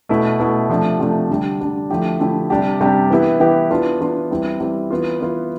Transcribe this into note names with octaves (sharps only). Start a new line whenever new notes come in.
B2 A3 E4
B2 A3 E4
C3 F3 A3 D4
C3 F3 A3 D4
D3 G3 D4 G4
D3 G3 D4 G4
D3 F3 A3 E4 G4
D3 F3 A3 E4 G4
C3 G3 D4 G4
C3 G3 D4 G4
E3 B3 E4 G4
E3 B3 E4 G4
E3 B3 D4 F4
E3 B3 D4 F4
E3 G3 C4 E4
E3 G3 C4 E4
E3 B3 F4
E3 B3 F4